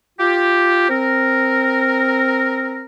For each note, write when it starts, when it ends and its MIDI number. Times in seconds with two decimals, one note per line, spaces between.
0.18 0.85 65
0.18 0.85 67
0.89 2.85 60
0.89 2.85 70